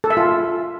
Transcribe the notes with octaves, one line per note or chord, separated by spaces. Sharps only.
A4
E5
F4